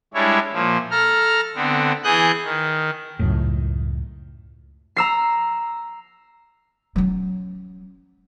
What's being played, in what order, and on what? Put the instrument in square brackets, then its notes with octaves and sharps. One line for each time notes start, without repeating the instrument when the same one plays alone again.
[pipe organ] G3 G#3 D4 E4 C#5
A#2 F3
A4 A#5 F6
D3 B3 C4
E3 G#4 D#6 F#6 G6
D#3
[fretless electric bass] C#2 F#2 A2
[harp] A#5 E6 C7
[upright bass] F#3 C#4